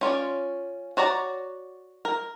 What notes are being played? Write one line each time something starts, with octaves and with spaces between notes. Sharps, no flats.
C#4 F4 C#5 D5
F#4 C#5 D5 A#5
A#4